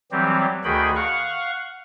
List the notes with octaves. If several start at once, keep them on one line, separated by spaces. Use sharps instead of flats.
E3 F#3 G3 C4 G4
D2 D#3 F#4 G#4 G5 B5
F5 F#5 C#6